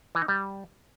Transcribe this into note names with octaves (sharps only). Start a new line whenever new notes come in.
E3
D#4
G3